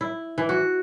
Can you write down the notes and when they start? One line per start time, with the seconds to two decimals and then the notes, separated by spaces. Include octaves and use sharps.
0.01 E4
0.38 E3
0.49 F#4